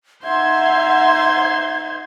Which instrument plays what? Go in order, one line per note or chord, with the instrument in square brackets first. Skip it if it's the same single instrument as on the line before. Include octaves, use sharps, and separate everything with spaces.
[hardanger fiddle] D#4 C6 [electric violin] C5 G#6 [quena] E5 [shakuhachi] F#5